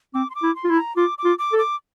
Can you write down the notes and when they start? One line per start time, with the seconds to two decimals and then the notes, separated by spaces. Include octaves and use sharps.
0.14 C4 D6
0.30 C6
0.35 D6
0.43 E4
0.56 C6
0.64 F4
0.70 E4
0.76 A#5
0.97 F4 D6
1.18 D6
1.24 F4
1.39 D6
1.53 A4
1.58 D6